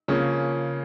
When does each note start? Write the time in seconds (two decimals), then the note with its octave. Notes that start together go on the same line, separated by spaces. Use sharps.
0.08 C#3 F3 A#3 C#4